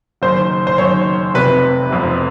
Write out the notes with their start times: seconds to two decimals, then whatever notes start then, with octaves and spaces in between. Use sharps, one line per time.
0.22 F#1 F#2 D#3 C5
0.67 C5
0.78 F#1 F#2 D#3 C#5
1.34 F1 F2 C3 B4
1.90 F1 F2 C3